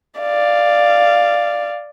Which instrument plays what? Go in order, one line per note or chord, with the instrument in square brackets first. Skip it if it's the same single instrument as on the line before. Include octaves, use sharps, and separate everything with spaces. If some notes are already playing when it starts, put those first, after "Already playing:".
[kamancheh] D5 F5